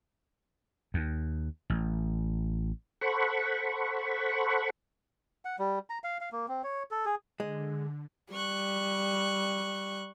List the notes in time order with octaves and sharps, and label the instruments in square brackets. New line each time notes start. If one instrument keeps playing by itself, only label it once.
[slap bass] D#2
A1
[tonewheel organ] A4 C5 F#5 B5 C#6
[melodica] F#5
G3
A#5
F5
F5
A#3
C4
C#5
A4
G#4
[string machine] D3 [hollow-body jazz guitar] G#3
[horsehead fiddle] G3 [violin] C#6 F#6